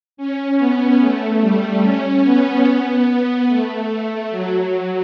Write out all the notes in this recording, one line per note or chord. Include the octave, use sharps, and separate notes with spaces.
C#4
B3
A3
G3
C#4
B3
A3
A3
F#3
F#3